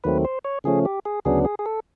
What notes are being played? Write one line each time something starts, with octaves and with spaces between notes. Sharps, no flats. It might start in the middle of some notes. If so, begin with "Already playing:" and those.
D#2 D#3 F#3 A3 C4 B4
C5
C#5
C#3 F3 A3 C#4 G#4
G4
G#4
D2 C#3 F#3 B3 D4 G#4
G#4
G#4
A4